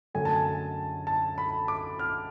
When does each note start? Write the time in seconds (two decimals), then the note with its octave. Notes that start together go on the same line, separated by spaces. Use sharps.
0.14 F#2 D3 F#3 A3 G#5
0.25 A5
0.36 G#5
1.07 A5
1.38 B5
1.68 D6
1.99 F6